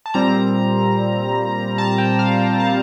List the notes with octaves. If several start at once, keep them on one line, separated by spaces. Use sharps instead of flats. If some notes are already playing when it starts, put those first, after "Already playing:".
A5
A#2 G3 C4 A#5
A5
G5
F5
G5
A5